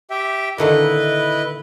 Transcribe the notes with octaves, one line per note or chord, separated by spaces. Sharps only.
G4 E5 G5
A#2 D3 D#3 E4 B4 D#5